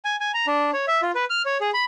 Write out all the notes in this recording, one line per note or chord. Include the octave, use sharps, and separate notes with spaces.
G#5
G#5
A#5
D4
C#5
E5
F4
B4
F6
C#5
G#4
B5